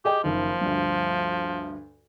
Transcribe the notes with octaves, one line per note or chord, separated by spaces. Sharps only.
G4 G#4 D#5 G5
F#1 D#3 F3
D2 G2